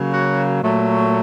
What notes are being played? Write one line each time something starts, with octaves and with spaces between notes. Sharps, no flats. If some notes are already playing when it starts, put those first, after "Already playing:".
Already playing: C#3 F#3 A#3
F#4
A#2 F#3 A3